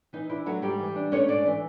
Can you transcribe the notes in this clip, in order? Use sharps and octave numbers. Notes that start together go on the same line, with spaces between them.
E3 D#4
D4 E4
F#3 A3 F#4
G#2 G3 G4
E3
D4
A3 C#4 C#5
G#2 D4 D5
E3